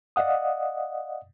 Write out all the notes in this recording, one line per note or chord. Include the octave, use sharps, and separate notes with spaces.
D5 D#5 F5 F#5 D#6